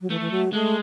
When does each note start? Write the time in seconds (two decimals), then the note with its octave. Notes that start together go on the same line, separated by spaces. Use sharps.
0.01 F#3
0.10 E3 A3
0.21 E3
0.31 F#3
0.53 G#3 A3